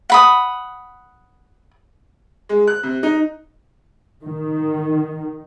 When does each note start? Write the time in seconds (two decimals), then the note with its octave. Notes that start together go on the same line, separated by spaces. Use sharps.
0.10 F#5 B5 D#6
2.49 G#3
2.67 F#6
2.83 C3
3.03 D#4
4.23 D#3